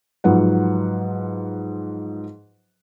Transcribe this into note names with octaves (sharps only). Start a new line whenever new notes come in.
G#2 F3 F#3 B4 F#5